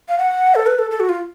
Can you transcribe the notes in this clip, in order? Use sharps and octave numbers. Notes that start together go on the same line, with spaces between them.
F5
F#5
A4
B4
A4
A4
F#4
F4